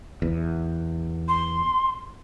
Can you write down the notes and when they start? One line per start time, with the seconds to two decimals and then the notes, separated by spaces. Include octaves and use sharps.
0.22 E2
1.28 C6